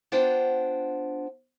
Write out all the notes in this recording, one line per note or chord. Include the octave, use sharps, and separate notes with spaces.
B3 D4 F4 C5 F#5 G5